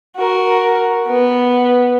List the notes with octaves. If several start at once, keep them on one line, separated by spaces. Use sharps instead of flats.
F#4 A#4
B3